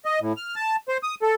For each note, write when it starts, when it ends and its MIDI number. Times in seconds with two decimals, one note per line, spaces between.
0.05 0.19 75
0.21 0.33 45
0.37 0.55 89
0.56 0.76 81
0.89 0.97 72
1.03 1.15 87
1.22 1.35 69